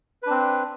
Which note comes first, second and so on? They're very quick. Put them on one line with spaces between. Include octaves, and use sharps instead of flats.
B4 D4 C4